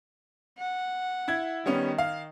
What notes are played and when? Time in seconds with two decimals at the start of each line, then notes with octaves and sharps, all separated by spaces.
0.58 F#5
1.28 E4 G#6
1.66 D#3 G3 B3 C#4
1.98 F5